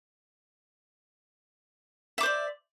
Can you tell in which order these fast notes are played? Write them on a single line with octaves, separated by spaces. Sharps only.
E5 D6 C5 D5